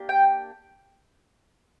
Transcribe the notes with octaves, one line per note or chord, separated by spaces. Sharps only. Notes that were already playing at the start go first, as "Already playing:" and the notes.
Already playing: A#3 D4 G4
G5